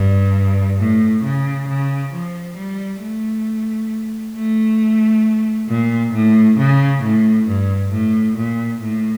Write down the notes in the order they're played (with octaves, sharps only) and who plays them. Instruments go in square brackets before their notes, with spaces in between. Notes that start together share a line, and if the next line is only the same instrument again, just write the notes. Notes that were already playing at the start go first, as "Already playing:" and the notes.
Already playing: [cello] G2
A2
C#3
C#3
F3
G3
A3
A3
A#2
A2
C#3
A2
G2
A2
A#2
A2